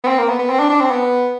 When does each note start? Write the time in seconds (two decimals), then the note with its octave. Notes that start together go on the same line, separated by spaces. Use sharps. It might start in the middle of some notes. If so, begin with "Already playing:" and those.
0.03 B3
0.07 C4
0.18 A#3
0.29 B3
0.39 B3
0.49 C4
0.59 D4
0.70 D4
0.81 C4
0.91 B3